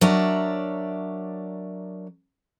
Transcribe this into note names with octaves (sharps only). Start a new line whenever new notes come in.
F#3 D4 A#4 C#5 D5 E5